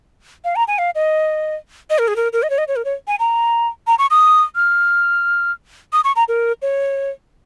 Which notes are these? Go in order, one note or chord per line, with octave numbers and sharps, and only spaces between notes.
F5
A#5
G#5
F5
D#5
D#5
A#4
G#4
A#4
A#4
D#5
C#5
D#5
C#5
A#4
C#5
G#5
A#5
A#5
C#6
D#6
F6
D#6
C#6
A#5
A#4
C#5